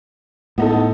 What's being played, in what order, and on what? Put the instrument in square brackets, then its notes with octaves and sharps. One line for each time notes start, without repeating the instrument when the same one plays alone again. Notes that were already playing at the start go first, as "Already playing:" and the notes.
[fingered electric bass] A2 [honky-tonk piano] B3 D#4 A4